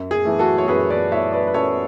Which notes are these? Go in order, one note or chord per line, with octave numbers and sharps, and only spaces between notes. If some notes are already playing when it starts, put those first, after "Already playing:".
Already playing: F#2
G#4
E3 A3
F#4 A4
C#5
F#2 G#4 B4
B4 D5
E3 A3 C#5 E5
B4 D5
B4
F#2 A4 C#5